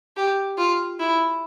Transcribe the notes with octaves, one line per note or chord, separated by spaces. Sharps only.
G4
F4
E4